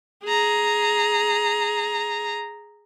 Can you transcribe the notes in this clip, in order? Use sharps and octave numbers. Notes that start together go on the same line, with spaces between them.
G#4 A#5